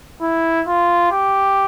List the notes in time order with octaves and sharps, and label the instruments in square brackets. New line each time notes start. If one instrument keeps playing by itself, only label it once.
[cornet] E4
F4
G4